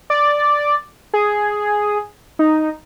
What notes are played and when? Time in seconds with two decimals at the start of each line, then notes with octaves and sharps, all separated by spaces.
0.10 D5
1.14 G#4
2.39 D#4